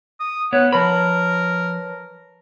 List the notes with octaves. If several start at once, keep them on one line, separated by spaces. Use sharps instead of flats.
D#6
B3 C#5 F#5
F3 A#4 B4 C#5 A5 B5